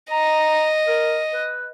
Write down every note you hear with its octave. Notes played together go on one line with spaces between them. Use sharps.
D#5 A#5
A#4
B4